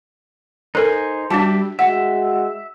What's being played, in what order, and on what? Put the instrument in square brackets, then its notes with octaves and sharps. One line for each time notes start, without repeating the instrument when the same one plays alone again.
[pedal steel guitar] D#4 C5 G#5 [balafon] A4 A#4
[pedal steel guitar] G3 G4 E5 [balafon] D4 F#4 A5
[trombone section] G#3 F#4 [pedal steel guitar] E5 [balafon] F#5